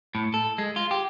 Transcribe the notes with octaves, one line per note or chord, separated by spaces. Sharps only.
A2
A4
G#3
F4
G4